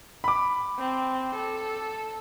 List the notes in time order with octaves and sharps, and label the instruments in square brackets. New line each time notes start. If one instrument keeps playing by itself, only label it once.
[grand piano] B5 D6
[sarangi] C4
A4